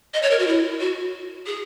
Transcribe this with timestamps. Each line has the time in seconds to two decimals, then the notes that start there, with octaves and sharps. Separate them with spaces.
0.14 D#5
0.22 C#5
0.31 A#4
0.39 F#4
0.47 E4
0.80 F#4
1.46 G#4